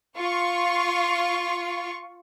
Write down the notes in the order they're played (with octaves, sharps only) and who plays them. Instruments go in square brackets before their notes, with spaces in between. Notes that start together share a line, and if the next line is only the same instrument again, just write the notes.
[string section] F4 C#6